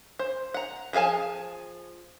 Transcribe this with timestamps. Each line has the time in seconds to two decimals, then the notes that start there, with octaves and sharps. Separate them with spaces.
0.19 C5
0.54 F#5 A#5
0.93 F3 G#4 F5 G#5 A5